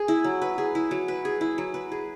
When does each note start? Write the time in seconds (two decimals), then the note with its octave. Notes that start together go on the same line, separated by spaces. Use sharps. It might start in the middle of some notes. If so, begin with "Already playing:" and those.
Already playing: G#4
0.08 E4
0.24 F#3
0.42 B4
0.58 G#4
0.75 E4
0.91 F#3
1.08 B4
1.25 G#4
1.41 E4
1.58 F#3
1.74 B4
1.92 G#4